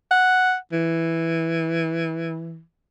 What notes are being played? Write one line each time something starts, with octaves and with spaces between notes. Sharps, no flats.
F#5
E3